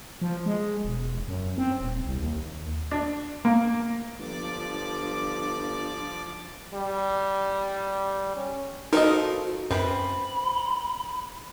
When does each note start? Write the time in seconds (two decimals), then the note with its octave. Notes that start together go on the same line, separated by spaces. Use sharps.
0.22 F3
0.46 G#3
0.85 E1
1.28 F#2
1.58 C4
1.80 D#1
2.06 C2
2.20 D#2
2.91 D4
3.45 A#3
4.19 G1 F3 D4 D5 D6
6.73 G3
8.36 C#4
8.93 F3 D#4 F#4 A4 A#4 D#5
9.71 F#2 C4 B4 B5